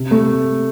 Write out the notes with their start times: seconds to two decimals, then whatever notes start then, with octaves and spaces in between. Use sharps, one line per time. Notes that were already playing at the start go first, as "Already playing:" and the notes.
Already playing: C3
0.11 A3